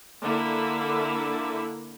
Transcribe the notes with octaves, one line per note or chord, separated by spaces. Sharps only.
D3 A#3 E4